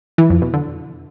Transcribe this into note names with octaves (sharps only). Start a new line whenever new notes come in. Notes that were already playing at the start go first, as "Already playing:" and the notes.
E3
F2
B2
D3